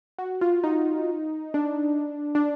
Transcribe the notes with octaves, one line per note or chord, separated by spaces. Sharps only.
F#4
F4
D#4
D4
D4